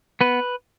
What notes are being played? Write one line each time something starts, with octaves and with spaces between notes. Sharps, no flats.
B3 B4